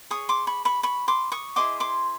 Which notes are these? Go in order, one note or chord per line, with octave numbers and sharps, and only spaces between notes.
G#4 C#5 C#6 D#6
C6 D6
B5 C#6
B5 C#6
B5 C#6
C6 D6
C#6 D#6
E4 G#4 C5 D#5 C6 D6
C6 D6